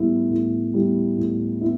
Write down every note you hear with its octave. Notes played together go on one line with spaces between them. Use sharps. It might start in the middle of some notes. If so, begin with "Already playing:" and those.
Already playing: A2 G3 B3 E4
A2
G3 B3 E4
A2
B3 E4